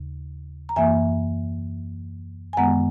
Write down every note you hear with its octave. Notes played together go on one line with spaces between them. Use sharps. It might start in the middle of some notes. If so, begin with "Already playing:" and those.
Already playing: D#2 C#3
A#5
F#2 E3 A#3 E5 G#5
G#5
F#2 D#3 G#3 B3 F#5 A#5